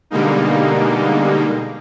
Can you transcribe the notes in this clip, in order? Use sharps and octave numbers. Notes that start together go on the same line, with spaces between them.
B2 D3 G3 G#3 A#3 D#4